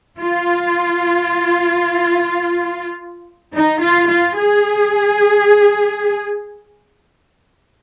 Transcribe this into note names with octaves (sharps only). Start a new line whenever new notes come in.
F4
D#4
F4
F4
G#4